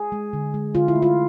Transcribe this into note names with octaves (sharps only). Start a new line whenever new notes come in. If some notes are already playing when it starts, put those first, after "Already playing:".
Already playing: G#4
G#3
D3
G#3
D3 F4
E4
A3
F4